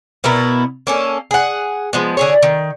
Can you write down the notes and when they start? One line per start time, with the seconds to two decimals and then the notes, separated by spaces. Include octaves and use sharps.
0.24 B2 B3 E4 A#4
0.87 A#3 C#4 A4
1.31 G#4 F#5
1.93 F3 G#3 B3
2.17 D3 G#4 C#5
2.43 D#3